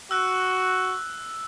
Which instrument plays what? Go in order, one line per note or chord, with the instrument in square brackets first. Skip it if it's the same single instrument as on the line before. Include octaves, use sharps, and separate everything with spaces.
[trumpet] F#4 [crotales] E6 F#6